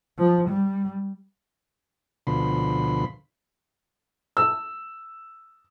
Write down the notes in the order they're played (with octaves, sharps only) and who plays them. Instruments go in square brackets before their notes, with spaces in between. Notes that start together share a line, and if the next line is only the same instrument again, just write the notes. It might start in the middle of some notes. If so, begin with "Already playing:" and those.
[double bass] F3
G3
[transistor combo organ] D2 B2 D3 F3 B5 C6
[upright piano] E6